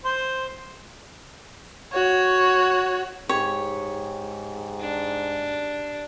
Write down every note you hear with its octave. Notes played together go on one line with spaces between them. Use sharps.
C5
F#4 C#5
G#2 G4 C#5
D4